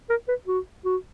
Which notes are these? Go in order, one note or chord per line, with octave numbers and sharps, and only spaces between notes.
A#4
B4
F#4
F#4